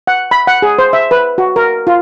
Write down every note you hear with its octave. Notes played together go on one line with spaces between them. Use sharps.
F#5
B5
F#5
G#4
C5
E5
B4
F#4
A#4
F4